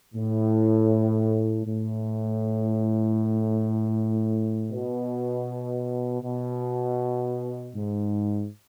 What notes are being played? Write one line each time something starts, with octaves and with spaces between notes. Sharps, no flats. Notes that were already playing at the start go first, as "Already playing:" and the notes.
A2
A2
B2
B2
G#2